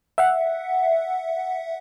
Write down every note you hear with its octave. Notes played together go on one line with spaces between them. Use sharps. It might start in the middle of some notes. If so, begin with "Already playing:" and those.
E5 F#5